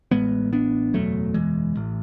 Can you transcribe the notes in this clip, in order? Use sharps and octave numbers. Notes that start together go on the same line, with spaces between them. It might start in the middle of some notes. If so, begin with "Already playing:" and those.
A1 A2 G#3 B3
B3 D4
F#1 E2 B2 F#3 A3
E3 G#3
A1 A2